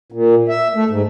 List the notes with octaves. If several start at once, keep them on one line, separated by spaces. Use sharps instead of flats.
A#2
E5
A3
G#2